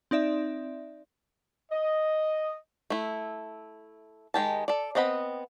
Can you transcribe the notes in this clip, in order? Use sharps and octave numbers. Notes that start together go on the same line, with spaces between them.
C4 D#4 D5 E5
D#5
A3 E4
D#3 G#3 G4 A5
A4 D5
B3 C4 D#5 F#5 B5